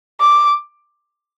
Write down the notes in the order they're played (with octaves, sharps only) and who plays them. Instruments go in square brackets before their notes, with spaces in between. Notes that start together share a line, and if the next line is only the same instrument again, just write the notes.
[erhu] D6